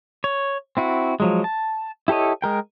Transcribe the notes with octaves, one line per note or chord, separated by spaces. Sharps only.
C#5
C4 E4 F#4
F3 F#3 G#3
A5
E4 G4 A4 C#5 D#5
G#3 A#4 G5